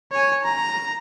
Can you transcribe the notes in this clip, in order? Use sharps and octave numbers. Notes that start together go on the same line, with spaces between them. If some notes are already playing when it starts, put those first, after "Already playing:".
C#5 G#5
A#5